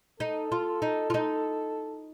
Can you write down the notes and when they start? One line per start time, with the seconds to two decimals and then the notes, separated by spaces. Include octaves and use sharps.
0.20 D#4 A4
0.52 F4
0.82 D#4
1.10 F4
1.14 D#4